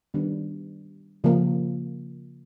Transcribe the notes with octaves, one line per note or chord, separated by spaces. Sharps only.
D#3 G3 B3 D4
C#3 F3 A#3